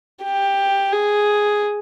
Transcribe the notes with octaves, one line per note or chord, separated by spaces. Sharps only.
G4
G#4